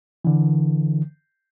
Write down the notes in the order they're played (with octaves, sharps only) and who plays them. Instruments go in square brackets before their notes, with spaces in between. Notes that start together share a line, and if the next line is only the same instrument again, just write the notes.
[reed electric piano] D3 E3